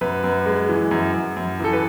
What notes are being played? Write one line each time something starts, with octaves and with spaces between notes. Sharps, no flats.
F#2 B4
F#2
G#3
E3
F#2
F#2
F#2
E3 A4
B4